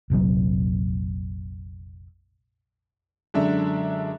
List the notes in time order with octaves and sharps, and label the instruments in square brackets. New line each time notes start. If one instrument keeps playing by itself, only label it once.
[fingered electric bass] F1 A#1 C3 F#3
[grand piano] F#2 D3 [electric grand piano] G#3 D4 E5